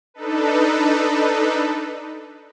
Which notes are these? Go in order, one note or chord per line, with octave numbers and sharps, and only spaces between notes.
D4 D#4 A4 B4